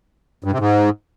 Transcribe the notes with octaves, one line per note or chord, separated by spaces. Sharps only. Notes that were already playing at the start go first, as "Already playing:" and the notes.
G2
C3
G#2